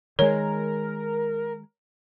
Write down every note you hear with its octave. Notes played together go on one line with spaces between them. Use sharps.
D#3 G#3 A#4 C#5